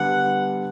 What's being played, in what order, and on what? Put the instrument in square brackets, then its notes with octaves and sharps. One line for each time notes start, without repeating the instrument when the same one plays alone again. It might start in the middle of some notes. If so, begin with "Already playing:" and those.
Already playing: [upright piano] D3 G3 B3 [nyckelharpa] F#5